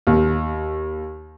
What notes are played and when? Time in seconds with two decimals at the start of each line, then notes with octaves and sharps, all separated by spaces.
0.07 D#2